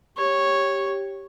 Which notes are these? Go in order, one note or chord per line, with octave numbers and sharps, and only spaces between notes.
G4 C#5